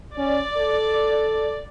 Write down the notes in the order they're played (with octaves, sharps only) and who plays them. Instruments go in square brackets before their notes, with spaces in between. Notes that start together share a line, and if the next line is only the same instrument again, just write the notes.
[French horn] C#4 [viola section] D5
[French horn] A4